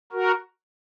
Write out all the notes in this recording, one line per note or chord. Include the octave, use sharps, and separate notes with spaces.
F#4 A#4